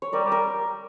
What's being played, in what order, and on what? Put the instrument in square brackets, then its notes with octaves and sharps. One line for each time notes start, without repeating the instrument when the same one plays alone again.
[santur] C#5
[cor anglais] G3 [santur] A#4 D5
[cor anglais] G3
[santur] A#4